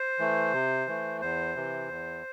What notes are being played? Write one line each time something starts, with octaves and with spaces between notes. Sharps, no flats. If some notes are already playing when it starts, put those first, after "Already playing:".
Already playing: C5
E3 A3
C3
E3 A3
E2 C5
C3 E3
E2